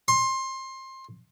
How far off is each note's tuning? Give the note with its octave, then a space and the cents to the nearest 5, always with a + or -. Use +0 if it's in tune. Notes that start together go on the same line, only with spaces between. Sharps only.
C6 +20